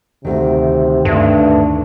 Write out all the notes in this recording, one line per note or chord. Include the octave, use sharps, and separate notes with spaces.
D2 C3 D#3
G2 A3 D4